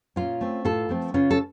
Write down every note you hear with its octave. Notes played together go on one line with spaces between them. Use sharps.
A#2 C#4 F4
A3 C4
A2 F4 A4
F3 A3 C4
C#3 C#4 F4
A4